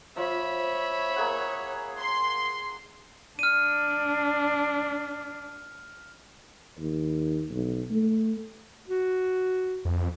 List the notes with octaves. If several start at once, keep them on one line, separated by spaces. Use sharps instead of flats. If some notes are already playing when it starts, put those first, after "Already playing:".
F3 C#5 E5 B5
A#3 G#4 F#5
C6
D4 F6 D#7
D#2
B1
A3
F#4
F2